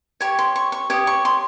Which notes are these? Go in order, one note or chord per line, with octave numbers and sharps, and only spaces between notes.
G4 C#5 C#6
C6
C#6
C#6
G4 C#5 D#6
C#6
C6